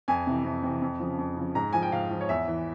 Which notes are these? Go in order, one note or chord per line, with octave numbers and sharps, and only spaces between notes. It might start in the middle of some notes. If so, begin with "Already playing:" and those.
F2 G#5
C3 E3
F2
C3 E3
F2
C#3 F3
F2
C#3 F3
G#2 A#5
F3 G#5
G5
G#2 F5
F3
C#5
E2 E5
E3